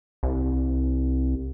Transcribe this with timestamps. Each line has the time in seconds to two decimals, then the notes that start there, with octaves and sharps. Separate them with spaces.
0.23 C2